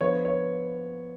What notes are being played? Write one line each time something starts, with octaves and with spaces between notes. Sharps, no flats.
D3 F3 B3 C#5
C#5